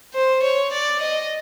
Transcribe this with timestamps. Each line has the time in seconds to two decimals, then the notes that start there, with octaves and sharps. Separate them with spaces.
0.14 C5
0.43 C#5
0.72 D5
1.01 D#5